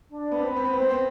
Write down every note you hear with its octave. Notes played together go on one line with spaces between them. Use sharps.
D4
B3 B5
C4
B3
C4 C5
B3
C4 C5
B3
C4